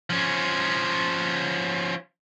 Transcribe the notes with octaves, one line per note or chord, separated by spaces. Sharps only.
F3 C#4